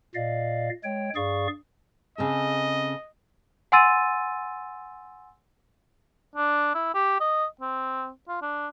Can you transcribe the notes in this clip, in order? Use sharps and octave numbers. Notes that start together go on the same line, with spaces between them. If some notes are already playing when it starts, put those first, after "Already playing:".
A#2 D5 D#5 F5
G#3 C#5 G5
G2 G#4 D5 F5 C#6
C#3 C4 A4 D#5
F#5 G#5 C6 E6 A6 D#7
D4
E4
G4
D#5
C4
F4
D4